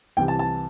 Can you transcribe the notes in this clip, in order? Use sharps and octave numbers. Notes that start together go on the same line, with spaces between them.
C2 C3 E3 G5
A5
A5